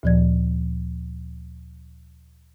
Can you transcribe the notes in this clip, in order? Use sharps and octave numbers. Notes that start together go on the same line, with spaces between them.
D2 A#2 F3 D5 G#6